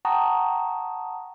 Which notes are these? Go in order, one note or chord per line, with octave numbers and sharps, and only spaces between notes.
F#5 G5 A5 A#5 C#6 D#6